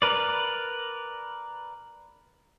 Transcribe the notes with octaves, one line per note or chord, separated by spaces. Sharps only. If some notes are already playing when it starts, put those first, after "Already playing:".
A#4 B4 D5